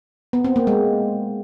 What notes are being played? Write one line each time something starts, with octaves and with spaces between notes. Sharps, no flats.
B3
C4
A#3
G#3